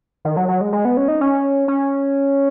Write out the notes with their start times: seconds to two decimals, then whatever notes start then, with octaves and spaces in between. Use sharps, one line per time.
0.25 D#3
0.37 F#3
0.48 F#3
0.61 G#3
0.73 G#3
0.85 B3
0.97 C#4
1.08 D#4
1.21 C#4
1.68 C#4